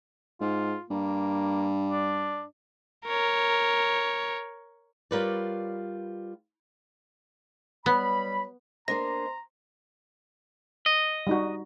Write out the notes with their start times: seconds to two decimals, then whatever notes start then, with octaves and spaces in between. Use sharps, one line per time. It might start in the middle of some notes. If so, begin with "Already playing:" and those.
0.41 G#2 F4
0.90 G2 A#3
1.90 D4
3.07 A#4 C#5
5.11 G3 F4 A#4 B4 C#5 D5
7.86 F#3 G3 B3 B5
8.88 A#3 D4 C5 D#5 A#5 C6 A#6
10.86 D#5
11.27 G3 D#4 F#4